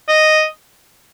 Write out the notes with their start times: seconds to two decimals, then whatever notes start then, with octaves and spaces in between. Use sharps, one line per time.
0.09 D#5